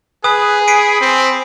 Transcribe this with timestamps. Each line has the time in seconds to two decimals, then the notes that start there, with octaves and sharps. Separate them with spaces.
0.24 G#4 B4 G#5 D#6
0.68 B5 C7 D7 D#7
1.01 C4